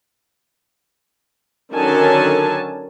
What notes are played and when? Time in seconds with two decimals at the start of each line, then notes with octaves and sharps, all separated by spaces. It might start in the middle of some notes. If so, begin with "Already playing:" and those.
1.74 D3 D#3 F#3 C#4 G#5 A5